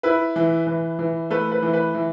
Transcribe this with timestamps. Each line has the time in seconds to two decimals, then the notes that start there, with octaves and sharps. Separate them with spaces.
0.03 E4 B4
0.36 E3
0.67 E3
0.99 E3
1.30 A3 B4
1.52 B4
1.63 E3
1.73 B4
1.94 E3